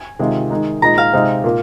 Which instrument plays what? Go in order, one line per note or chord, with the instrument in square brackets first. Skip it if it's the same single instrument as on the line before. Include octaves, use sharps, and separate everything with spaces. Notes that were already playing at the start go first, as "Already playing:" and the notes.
Already playing: [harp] G#5
[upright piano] C3 D#3 G#3 F4
D#3 G#3 D#4
[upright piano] A#2 G#3 D#4 [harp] A#5
[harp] F5
[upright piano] C3 G#3 C4 D#4
A#2 A#3